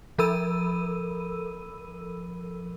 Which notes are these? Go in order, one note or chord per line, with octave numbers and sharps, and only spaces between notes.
F3 A4 A#4 B5 E6 D#7